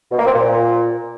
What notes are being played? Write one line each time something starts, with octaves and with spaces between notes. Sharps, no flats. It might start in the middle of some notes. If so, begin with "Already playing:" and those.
B2
A#3
C4
A#2